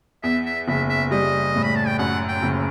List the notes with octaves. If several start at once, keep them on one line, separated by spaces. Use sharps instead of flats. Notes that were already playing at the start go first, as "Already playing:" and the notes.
E2 E5
E5
F#1 E5
E5
G3 D#5
A2
B5
A5
G5
F#2 F#5
G5
F#1